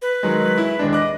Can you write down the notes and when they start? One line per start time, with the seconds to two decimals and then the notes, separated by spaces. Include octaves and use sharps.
0.02 B4
0.23 D#3 F#3 G#3
0.58 E4
0.79 D#2 G#3 D4
0.93 D#5 D6 F#6